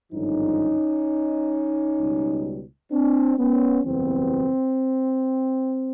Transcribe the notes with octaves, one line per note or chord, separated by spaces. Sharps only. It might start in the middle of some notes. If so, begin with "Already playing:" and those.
G#1 G2 D3 F3 C#4 D#4
C#2 B2 G3
C4 D4
B3 C#4
F#1 E2 B2 G3 B3 C4